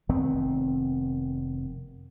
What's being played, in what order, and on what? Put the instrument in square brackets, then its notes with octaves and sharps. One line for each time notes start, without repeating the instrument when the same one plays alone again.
[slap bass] F1 D#3 B3 C4